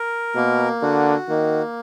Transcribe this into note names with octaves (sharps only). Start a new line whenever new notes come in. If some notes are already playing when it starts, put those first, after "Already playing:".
Already playing: A#4
B2 A#3
D3 F#4
D#3 A#3